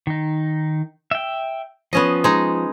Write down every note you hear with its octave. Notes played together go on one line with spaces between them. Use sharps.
D#3 D#4
E5 G5
F3 B3 C#4 D#5
G#3 D#4